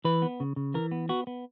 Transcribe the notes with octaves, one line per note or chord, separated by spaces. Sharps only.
E3 B4
B3
C#3
C#3
E3 A#4
B3
B3 F#4
B3